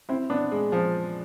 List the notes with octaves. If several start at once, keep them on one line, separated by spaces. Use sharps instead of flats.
C4 E4
B3 D4
G#3
F3